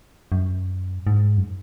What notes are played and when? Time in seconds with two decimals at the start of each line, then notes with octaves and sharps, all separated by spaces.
0.32 F#2
1.07 G#2
1.37 F#2